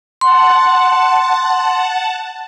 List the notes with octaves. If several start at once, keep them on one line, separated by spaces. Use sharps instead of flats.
F#5 A5 C6